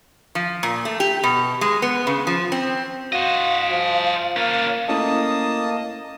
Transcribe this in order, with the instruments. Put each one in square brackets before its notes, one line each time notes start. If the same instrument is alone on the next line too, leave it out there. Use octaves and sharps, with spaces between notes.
[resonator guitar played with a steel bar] F3
A#2
A3
G4
B2
G#3
B3
C#3
F3
C4
[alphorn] F#4 [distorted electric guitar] C5 D#5 [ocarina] F5
[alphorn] F3
[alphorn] A#3 [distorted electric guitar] C#4 F4
[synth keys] A3 C#4 E4 [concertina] A#3 D#5 [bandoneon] A5 D#6